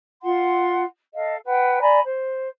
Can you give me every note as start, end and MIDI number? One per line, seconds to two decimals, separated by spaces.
0.23 0.83 65
0.23 0.83 78
0.23 0.83 84
1.14 1.36 69
1.14 1.36 75
1.14 1.36 77
1.45 1.78 71
1.45 1.78 78
1.45 1.78 79
1.80 1.99 74
1.80 1.99 80
1.80 1.99 82
1.80 1.99 83
2.03 2.47 72